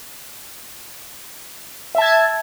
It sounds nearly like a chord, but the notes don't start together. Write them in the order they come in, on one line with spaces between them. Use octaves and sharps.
E5 A5 G#6